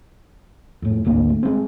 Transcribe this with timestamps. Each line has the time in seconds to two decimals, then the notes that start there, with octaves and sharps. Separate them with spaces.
0.82 F2 A2
1.05 G#1 D2 A#3 D4
1.30 A3
1.43 G#3 C4